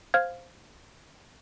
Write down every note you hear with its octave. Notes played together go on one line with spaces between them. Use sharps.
C5 F5 F6 G#6